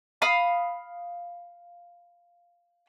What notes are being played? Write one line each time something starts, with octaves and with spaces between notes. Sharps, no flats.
F5 B5 D#6